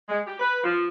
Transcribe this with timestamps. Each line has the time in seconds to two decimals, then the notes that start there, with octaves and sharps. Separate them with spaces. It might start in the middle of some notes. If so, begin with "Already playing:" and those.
0.09 G#3
0.27 G4
0.40 B4
0.64 F3